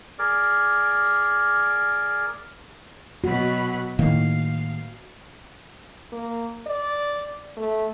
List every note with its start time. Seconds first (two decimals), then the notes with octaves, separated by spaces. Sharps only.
0.19 G#4 A#4 D5
3.24 B2 F#3 F#4 B5
3.99 A2 D#3 A#3 F5
6.12 A#3
6.66 D5
7.57 A3